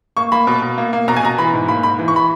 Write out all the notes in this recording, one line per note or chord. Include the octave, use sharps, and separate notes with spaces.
A#3 C#6
A#3 B5
B2
B2
A#3
A#3
B2 A#5
G#5
B2 A#5
E3 B5
G#2
A#3 B5
G#2 B5
E3
C#6
B5